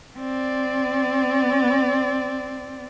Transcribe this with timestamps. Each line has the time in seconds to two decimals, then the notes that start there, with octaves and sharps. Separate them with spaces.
0.19 C4 D5